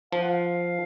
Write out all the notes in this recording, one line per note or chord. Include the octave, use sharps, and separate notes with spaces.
F3 F5
F#5
F5